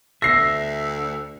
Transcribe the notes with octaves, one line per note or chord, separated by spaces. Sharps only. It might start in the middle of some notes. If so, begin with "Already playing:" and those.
D2 E5 A#6 C7